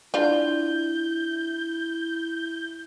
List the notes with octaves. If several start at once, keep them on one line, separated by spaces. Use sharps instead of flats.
D4 E4 F4 B5 G6